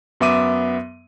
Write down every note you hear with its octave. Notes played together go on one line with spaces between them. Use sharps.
F#2 B3 E5 D6 D#7